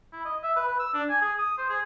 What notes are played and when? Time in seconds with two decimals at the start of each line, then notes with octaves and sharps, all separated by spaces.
0.13 E4
0.25 D#5
0.43 E5
0.56 B4
0.68 B4
0.80 E6
0.94 D4
1.10 G#5
1.22 G#4
1.39 D#6
1.58 C5
1.69 G#4